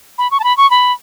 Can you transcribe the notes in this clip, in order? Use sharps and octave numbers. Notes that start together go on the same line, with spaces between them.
B5
C#6
A5
B5
C#6
B5